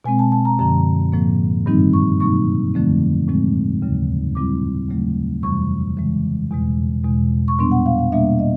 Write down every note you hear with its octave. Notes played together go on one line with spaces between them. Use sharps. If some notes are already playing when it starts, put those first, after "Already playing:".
B2 G#3 C4 G#5
A5
A5
A#5
F#2 D3 F3 A#5
A2 F3 A#3
G2 D#3 G3 C4 D#4
C#6
B2 F#3 A#3 D#4 C#6
F2 D3 F3 A3 C4
A2 F3 G#3 C4
D#2 C#3 F#3
A#2 G3 C4 E4 D6
D#2 C#3 F#3 A3
F2 C3 E3 G3 C#6
C#3 E3 G#3
E2 B2 G#3
E2 B2 G#3
C#6
A#2 G3 B3 D4 C6
F#5
F5
F5
B2 G3 A#3 D4 E5
D#5